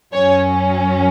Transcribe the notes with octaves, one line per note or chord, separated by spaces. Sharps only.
F#2 F#3 C#4 C#5